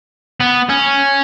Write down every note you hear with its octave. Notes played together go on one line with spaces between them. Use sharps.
B3
C#4